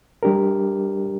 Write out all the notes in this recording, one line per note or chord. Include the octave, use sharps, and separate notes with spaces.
G3 D4 G4 A#4